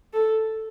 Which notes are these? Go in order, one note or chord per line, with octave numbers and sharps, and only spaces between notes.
A4